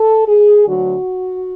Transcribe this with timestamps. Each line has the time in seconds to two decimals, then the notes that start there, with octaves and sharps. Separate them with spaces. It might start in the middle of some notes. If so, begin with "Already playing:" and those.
Already playing: A4
0.28 G#4
0.67 D2 D3 F#3 F#4